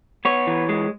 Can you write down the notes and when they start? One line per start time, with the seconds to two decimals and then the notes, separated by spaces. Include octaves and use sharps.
0.25 B3 C#5
0.47 E3
0.69 G#3